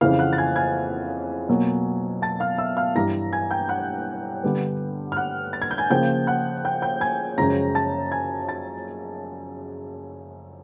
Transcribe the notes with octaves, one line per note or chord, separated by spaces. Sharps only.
F2 C#3 E3 F5 F6
F#5 F#6
A6
G#5 G#6
G#5 G#6
B2 F#3 A#3
A5 A6
F5 F6
E5 E6
F5 F6
G2 E3 G3 A#5 A#6
G#5 G#6
G5 G6
F#5 F#6
D3 G3 B3
F6
F#5 F#6
A6
G#6
G6
G#5 G#6
C#3 F3 A#3 G5 G6
F#5 F#6
G5 G6
G5 G6
G#5 G#6
F#2 C#3 F3 G#3 C#4 A#5 A#6
A5 A6
G#5 G#6
A5 A6